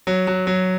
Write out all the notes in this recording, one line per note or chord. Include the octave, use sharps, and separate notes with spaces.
F#3
F#3
F#3